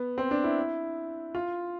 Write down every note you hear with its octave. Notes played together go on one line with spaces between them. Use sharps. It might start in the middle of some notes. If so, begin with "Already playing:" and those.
Already playing: B3
C4
D4
E4
F4